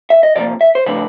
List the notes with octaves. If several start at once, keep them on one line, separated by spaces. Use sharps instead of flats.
E5
D#5
C3 F3 A#3 D5
E5
C5
C#3 F3 A3 D4 B4